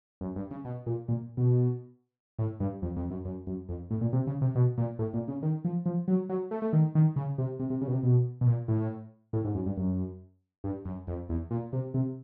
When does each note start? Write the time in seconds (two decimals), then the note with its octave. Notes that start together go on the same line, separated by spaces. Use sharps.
0.21 F#2
0.36 G2
0.51 C#3
0.65 B2
0.86 A#2
1.08 A#2
1.37 B2
2.39 A2
2.60 G2
2.82 F2
2.96 F2
3.11 F#2
3.25 F#2
3.47 F#2
3.69 F2
3.91 A2
4.01 A#2
4.13 C3
4.27 C#3
4.41 C3
4.55 B2
4.78 A#2
4.99 A2
5.14 A#2
5.28 C#3
5.43 D#3
5.64 F3
5.86 F3
6.08 F#3
6.29 F#3
6.51 A3
6.62 A3
6.73 D#3
6.95 D#3
7.16 C#3
7.38 C3
7.60 C3
7.70 C3
7.81 C#3
7.88 B2
7.92 C3
8.03 B2
8.41 B2
8.47 A#2
8.68 A2
9.33 A2
9.45 G#2
9.55 F#2
9.66 G2
9.77 F#2
10.64 G2
10.85 F#2
11.07 F2
11.29 E2
11.51 A#2
11.73 C3
11.94 C3